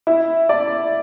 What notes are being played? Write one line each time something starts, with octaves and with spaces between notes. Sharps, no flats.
E4
D5